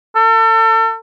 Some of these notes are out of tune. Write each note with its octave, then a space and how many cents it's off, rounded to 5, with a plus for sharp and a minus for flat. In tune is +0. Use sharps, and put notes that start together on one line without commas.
A4 +35